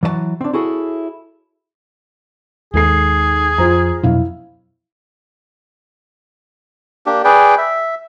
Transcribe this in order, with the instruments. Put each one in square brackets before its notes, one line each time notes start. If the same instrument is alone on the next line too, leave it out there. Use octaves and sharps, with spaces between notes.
[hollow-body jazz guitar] E3 F#3 D5 A5
C4 D4
E4 F#4 G#4 A4 C#5
[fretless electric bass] D#2 [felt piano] G#2 A4 C7 [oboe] G#4
[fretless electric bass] F2 [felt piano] F4 C5 A#5
[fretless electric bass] F2 B2 F#3 [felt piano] E4 F5
[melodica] A#3 D4 G4
G#4 B4 D5 G5
E5